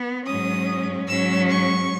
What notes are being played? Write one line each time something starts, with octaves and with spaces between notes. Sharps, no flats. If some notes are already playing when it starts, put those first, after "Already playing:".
Already playing: B3
G#2 F#3 C#4 D#6
G#2 F#3 C#4 E6
C#6